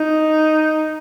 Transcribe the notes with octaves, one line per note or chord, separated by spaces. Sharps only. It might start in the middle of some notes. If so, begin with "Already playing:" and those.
Already playing: D#4